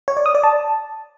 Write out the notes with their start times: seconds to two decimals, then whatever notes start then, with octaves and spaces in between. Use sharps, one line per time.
0.08 C#5
0.17 D5
0.26 D#6
0.35 D5
0.44 A5